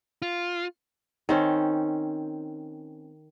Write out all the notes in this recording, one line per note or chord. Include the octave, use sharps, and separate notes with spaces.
F4
D#3 C4 C#4